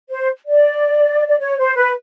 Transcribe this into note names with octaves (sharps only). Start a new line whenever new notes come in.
C5
D5
D5
C#5
C5
B4